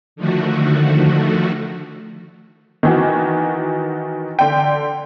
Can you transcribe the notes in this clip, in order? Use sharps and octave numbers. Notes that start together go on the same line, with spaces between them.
D3 D#3 F3 A3 F#4
D#3 E3 F#4
D3 G5